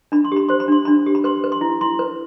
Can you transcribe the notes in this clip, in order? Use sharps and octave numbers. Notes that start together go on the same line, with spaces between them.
D4 B5
C6
G4 B5
C5 C6
B5
D4 C6
D4 B5
G4
B5
B4 C6
B4
C6
E4
E4 C6
B4